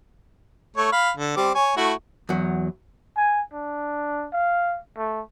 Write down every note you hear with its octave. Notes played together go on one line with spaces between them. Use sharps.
A3 C#5
F5 B5
D3
G3 C4 D6
C#5 G#5
A3 E4 F#4
E2 F#3
G#5
D4
F5
A3